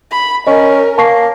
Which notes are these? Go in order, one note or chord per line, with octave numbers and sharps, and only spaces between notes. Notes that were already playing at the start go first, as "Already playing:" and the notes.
B5
C#4 A#4 D#5
A#3 A5 C#6 C7